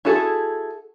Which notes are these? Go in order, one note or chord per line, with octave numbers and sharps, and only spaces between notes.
E4 F#4 G#4 A4